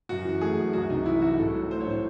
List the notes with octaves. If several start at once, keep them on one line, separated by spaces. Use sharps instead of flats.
F#2 F#4
E3
A3 G#4
F#2
C2 F#4
C3 D#4
E3 E4
C2 F#4
A2 A4
F#3
A3 C5
C#5
A2 C5